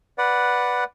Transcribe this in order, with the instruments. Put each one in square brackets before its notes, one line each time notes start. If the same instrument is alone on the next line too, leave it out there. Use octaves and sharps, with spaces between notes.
[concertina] B4 D5 F#5